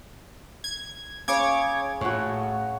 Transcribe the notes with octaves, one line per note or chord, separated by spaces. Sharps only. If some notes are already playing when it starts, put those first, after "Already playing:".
G#6
C#3 C#5 D6 G#6
A2 F#4 C#5